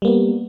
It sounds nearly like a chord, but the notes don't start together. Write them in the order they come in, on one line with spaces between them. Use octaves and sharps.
G3 A#3 B3